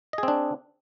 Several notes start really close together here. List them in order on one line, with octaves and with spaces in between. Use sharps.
D#5 G#4 C4 D4